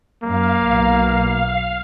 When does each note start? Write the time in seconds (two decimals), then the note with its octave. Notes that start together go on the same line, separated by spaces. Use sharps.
0.23 F#2 A#3 F5
0.64 B1 B2